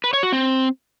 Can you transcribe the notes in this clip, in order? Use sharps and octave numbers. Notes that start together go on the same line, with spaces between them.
B4
C#5
F#4
C4